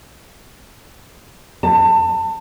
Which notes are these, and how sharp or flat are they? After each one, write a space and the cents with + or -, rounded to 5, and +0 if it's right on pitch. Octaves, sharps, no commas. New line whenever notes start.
A5 +30